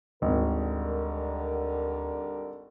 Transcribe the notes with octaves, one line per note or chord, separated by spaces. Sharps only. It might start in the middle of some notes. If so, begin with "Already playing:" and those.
G#1 D2 D3 G3 A#4